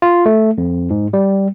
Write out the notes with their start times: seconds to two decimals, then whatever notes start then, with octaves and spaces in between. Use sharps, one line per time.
0.02 F4
0.26 A3
0.58 F2
0.90 G#2
1.13 G3